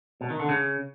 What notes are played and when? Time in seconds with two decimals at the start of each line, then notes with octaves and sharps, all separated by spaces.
0.21 B2
0.30 D#3
0.40 D3
0.49 C#3